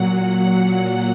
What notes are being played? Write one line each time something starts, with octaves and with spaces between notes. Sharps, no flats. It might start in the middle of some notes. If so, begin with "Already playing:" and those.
Already playing: A#2 F#3 F#5
F#5